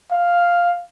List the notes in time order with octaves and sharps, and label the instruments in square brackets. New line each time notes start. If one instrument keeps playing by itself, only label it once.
[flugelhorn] F5